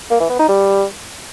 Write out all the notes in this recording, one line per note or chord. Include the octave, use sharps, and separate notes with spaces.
A#3
E3
B3
D#4
G3